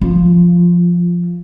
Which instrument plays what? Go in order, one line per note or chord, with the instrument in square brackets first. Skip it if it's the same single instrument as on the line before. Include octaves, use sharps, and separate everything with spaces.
[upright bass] F3